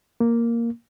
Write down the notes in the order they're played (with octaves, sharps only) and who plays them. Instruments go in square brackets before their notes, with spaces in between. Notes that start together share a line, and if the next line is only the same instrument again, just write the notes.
[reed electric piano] A#3